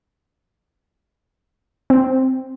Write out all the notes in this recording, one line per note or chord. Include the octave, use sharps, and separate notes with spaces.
C4